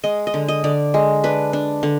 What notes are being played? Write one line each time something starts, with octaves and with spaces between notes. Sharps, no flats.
G#3 D#5
D#5
D3
D#5
D3 D5
G#3
D4 B4
D4
D3